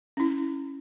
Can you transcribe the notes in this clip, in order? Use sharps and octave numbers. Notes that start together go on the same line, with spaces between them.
C#4 E4